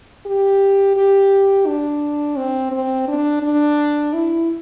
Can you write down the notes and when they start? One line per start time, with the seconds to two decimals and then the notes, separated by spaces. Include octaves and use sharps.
0.26 G4
0.96 G4
1.67 D4
2.36 C4
2.72 C4
3.08 D4
3.42 D4
4.13 E4